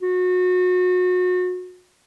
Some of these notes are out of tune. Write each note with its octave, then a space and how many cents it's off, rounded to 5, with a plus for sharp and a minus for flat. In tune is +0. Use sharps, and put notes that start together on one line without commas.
F#4 -30